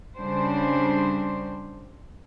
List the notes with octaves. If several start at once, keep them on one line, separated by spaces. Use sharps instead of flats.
C#3 G3 D4 C5